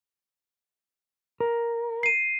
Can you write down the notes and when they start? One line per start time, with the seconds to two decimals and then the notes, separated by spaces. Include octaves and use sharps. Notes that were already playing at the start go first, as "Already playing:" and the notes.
1.40 A#4
2.03 C7 D#7